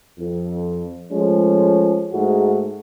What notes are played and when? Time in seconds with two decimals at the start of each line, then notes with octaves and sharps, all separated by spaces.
0.19 F2
1.12 F3 G#3 A3 C#4
2.13 G#2 A3 F#4